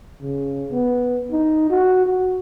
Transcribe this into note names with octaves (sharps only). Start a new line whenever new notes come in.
C#3
B3
D#4
F#4
F#4